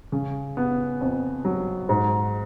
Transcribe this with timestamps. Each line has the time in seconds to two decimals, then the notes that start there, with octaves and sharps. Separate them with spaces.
0.12 C#3
0.57 B3
1.01 F2
1.45 F#3
1.89 G#2